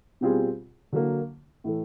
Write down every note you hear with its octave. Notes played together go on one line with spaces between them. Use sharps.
B2 G3 C4 F4 G#4
D3 F#3 A#3
A2 E3 A3